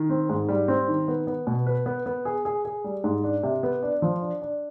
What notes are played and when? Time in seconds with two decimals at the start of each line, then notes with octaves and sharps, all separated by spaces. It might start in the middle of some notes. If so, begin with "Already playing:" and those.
Already playing: D#3
0.10 C4
0.29 G#2
0.48 G3
0.68 C4
0.88 D#3
1.08 B3
1.27 B3
1.47 B2
1.66 B4
1.86 B3
2.06 B3
2.25 G#4
2.45 G#4
2.65 G#4
2.84 G3
3.04 G#2
3.23 D4
3.43 C3
3.63 B3
3.83 D4
4.02 F3
4.22 D4
4.42 D4